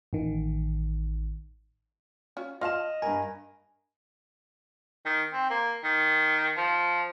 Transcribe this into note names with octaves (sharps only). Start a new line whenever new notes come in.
A1 D#3
C#4 F4 F#4
F4 D#5 F5 A5 F6 E7
G2 A#4 G#5
D#3
C4
A#3
D#3
F3